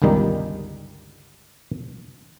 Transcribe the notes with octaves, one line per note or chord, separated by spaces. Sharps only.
G1 C#2 D#3 G3 D#4